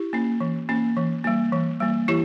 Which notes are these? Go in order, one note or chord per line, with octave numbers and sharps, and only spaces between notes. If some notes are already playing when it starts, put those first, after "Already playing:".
Already playing: E4 G4
A#3 C#4
E3
A#3 C#4
E3
G3 A#3
E3
G3 A#3
E3 E4 G4